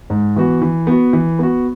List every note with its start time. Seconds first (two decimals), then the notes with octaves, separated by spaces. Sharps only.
0.10 G#2
0.36 E3 B3 F#4
0.62 E3
0.87 B3 F#4
1.13 E3
1.39 B3 F#4